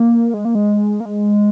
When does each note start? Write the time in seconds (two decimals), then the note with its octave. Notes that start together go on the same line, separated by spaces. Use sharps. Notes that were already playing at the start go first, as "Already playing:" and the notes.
Already playing: A#3
0.34 G#3
0.45 A#3
0.55 G#3
1.00 A#3
1.05 G#3